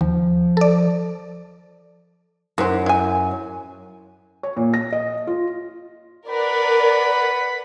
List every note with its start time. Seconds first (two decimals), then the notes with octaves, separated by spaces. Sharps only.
0.01 D#2 F3
0.57 A4 D5
2.58 F#2 D#3 C5
2.86 E4 G#5
4.43 C#5
4.57 A#2
4.74 A#6
4.92 D#5
5.27 F4
6.28 A#4 B4 D5 F#5 B5